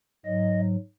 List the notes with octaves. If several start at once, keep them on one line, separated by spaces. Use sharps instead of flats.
G#2 F#3 D#5